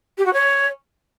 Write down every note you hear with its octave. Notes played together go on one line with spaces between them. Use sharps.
G4
F#4
C#5